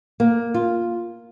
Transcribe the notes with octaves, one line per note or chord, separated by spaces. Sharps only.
A#3
F4